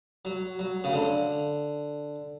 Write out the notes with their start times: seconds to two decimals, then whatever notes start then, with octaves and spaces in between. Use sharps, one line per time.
0.25 F#3
0.59 F#3
0.84 C#3
0.93 D3